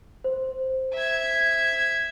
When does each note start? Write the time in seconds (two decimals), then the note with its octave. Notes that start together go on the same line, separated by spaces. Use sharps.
0.24 C5
0.94 E5 G#6